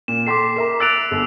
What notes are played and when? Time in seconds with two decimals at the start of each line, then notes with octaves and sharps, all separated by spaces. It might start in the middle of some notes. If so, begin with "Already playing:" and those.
0.08 A#2 E7
0.27 A4 G5 C6 D6 B6 C7
0.56 A#4 E5 A#5
0.80 E6 F#6 A6 D7 F7
1.11 G1